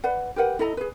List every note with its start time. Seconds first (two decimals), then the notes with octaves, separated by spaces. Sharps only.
0.04 B4 D5 F#5
0.36 G4 A#4 B4 F#5
0.59 E4 A4 D#5 A#5
0.77 G#4 B4